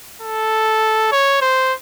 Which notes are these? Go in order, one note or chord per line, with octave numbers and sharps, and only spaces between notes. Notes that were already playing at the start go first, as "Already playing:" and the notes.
A4
C#5
C5